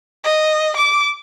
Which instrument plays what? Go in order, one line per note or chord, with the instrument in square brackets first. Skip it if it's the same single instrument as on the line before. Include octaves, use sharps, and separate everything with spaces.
[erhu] D#5
D6